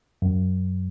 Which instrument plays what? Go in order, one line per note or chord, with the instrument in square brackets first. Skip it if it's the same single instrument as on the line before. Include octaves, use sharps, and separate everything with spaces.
[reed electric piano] F#2